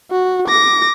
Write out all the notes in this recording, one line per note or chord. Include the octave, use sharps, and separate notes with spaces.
F#4
D6 A#6